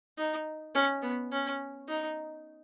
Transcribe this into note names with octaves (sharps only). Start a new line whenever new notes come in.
D#4
C#4
B3
C#4
D#4